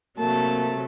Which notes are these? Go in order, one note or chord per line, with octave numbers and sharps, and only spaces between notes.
C3 F#3 A3 A#3 A5